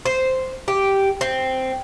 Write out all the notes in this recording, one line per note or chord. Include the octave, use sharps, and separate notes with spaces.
C5
G4
C4